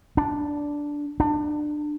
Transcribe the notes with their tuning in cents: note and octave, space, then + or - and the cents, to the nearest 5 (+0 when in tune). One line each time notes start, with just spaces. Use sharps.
D4 -5
D4 +25